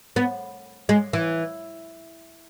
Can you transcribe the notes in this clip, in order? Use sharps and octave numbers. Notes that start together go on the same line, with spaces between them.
B3
G#3
E3